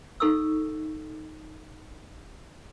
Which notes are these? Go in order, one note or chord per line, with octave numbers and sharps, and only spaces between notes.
D#4 A4 C#6 E6